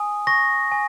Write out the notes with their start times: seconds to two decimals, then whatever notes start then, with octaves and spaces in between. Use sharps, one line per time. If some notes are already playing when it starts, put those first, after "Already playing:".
Already playing: G#5 D#6
0.27 C#6 A#6
0.72 G#5